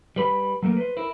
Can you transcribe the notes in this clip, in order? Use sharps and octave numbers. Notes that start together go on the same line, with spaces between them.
G3 B4 B5
F#3 A3 A#3 A#4
B4 C5
E4 A#4